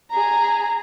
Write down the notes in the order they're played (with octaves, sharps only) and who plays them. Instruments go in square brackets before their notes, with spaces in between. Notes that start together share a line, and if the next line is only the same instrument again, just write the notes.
[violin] G#4 A#5